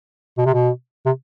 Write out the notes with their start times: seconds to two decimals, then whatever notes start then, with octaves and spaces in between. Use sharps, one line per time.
0.38 B2
0.46 C3
0.54 B2
1.06 C3